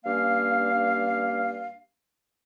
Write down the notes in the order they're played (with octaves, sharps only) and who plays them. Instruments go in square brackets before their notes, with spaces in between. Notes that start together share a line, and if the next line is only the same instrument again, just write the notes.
[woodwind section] G2 A#3 C#4 F5